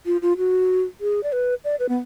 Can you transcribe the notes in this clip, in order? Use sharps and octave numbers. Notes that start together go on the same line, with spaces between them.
F4
F4
F#4
G#4
D5
B4
D5
B4
B3